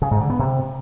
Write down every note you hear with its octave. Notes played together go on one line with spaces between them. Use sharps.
C#3
G#2
D3
B3
C3